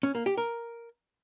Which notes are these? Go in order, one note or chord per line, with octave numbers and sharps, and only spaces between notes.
C#4
A#3
G4
A#4